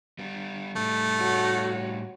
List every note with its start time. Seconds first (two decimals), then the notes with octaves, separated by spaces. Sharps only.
0.19 G3 B3
0.76 A2 G3 A3
1.20 F#4 C#5